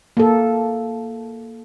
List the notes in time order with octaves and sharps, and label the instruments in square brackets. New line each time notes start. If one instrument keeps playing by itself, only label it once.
[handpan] A#3 A4